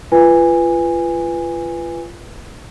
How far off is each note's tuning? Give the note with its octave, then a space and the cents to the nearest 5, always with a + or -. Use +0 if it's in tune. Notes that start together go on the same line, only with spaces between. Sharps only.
F4 -25 B4 +0 G#5 -15